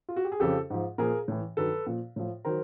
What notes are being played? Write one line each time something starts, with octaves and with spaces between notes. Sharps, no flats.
F4
F#4
G4
G#4
F2 C#3 F3 G4 A4
G#2 F3
A#2 F3 G#4 A#4
A2 E3
G2 D#3 F#3 A4 B4
A#2 F3
A2 F3
D#3 F#3 A#4 C5